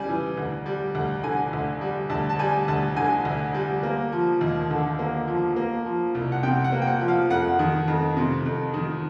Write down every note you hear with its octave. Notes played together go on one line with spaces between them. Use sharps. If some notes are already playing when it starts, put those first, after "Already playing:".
Already playing: C#3 G3 G#5
E3
D2
G3
D2
D3 G#5
D2
G3
D2 A5
A5
G3 G#5
D2 A5
D3 G#5
D2
G3
A#3
F3
D#2
D3
A#3
F3
A#3
F3
C2
F#5
C3 G5
F#5
A#3
G5
F#5
F3
F5
F2 F#5
D#3
F2
C3
F2
D#3